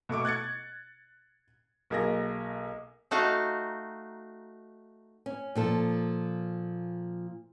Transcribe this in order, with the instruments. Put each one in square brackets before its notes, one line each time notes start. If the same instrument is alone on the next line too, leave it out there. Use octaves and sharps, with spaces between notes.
[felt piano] B2 A3 C#6 D6
F#6 G#6 A6 C#7
B1 A#3 G#4 A#4 A#6
[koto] A3 D#4 F#4 F5 A#5
[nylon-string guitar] C#4
A#2 F3 A4